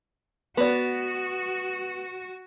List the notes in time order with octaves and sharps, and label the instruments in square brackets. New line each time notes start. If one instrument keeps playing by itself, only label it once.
[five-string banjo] B3 D5 [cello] F#4